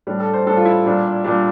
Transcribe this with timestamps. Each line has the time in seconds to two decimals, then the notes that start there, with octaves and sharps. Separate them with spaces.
0.07 A2 G3 D4
0.20 A4
0.34 C5
0.47 A2 G3 D4 A4
0.57 F4
0.65 E4
0.86 A#2 G3 D4
1.24 A#2 G3 D4